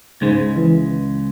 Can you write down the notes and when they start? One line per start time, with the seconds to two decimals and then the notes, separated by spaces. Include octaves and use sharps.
0.22 C#2 G#2 C#3 G#3
0.56 E3